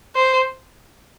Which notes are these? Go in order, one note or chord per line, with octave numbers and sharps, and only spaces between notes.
C5